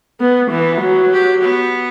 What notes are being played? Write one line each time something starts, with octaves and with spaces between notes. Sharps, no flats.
B3
E3 B3
F#3
G4
B3